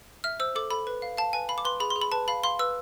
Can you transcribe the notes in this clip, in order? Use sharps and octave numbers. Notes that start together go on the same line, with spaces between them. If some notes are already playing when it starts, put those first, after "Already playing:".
E5 F6
C5 E6
A4 D6
A4 B5
B4
F5
F5 A5
B4 G#5
F5 B5
D6
B4 C6
G#4 B5
C6
G#4
B5
B4 A5
F5 B5
F5 C6
B4 E6